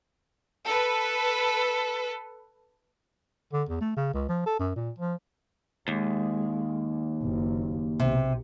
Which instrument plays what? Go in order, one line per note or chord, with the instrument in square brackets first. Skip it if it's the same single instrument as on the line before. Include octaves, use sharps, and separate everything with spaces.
[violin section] A4 B4
[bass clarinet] D3
E2
A3
C#3
C#2
F3
A4
F#2
A#2
F3
[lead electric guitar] D#2 [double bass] G#3
[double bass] F#1
[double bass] B1 [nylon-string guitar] C3